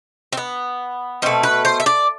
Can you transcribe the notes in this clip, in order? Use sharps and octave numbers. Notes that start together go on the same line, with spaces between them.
C4
B3
B2 A3 C4
B4
C5
E5
D5